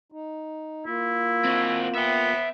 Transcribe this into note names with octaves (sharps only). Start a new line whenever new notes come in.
D#4
A#3 E4 F4
C4 F#4
B3 E5 G5